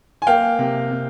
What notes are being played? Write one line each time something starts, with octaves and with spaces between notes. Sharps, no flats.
G#5
A#3 F5 G5
C3
C3